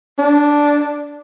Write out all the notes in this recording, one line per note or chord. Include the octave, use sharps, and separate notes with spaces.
D4